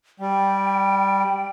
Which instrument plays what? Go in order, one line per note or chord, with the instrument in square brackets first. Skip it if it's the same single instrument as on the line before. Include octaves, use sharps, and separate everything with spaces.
[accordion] G3 [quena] G5